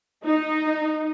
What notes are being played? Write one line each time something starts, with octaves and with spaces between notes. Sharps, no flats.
D#4